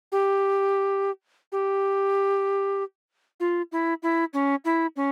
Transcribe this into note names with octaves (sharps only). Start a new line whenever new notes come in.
G4
G4
F4
E4
E4
C#4
E4
C#4